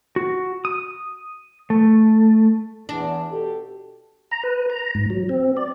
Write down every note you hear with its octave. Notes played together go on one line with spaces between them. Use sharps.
F#4
D#6
A3
E2 D4
B2 G4 A4
A#5
B4
A#5
G#2
F#3
C4
D5